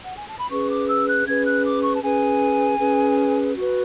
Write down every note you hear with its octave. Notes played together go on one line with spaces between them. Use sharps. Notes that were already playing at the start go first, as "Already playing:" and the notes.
F#5
G#5
A5
B5
C#4 G#4 B4 C#6
D6
E6
F#6
C#4 G#4 B4 G#6
F#6
D6
C#6
A5
C#4 G#4 B4 G#5
C#4 G#4 B4
F#4 B4